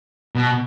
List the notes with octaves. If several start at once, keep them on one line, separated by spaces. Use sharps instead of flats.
B2